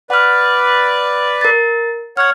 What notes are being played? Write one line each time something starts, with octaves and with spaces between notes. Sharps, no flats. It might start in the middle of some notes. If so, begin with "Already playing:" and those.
B4 D5 F#5 F6
A#4 A6
C#5 F#5 F6 G#6